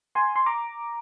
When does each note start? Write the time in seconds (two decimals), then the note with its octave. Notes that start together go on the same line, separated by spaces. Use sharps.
0.15 G#5 C6
0.36 C6
0.46 A#5 D6